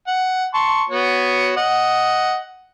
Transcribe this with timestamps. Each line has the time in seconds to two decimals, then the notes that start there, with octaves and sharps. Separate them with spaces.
0.07 F#5
0.54 A5 C6 C#6
0.89 B3 F#4 C#5
1.57 D#5 F#5